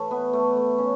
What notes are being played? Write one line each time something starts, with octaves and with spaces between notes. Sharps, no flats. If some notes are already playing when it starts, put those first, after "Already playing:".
Already playing: A2 E3 A3
B3
A3
A3
C#3 C#4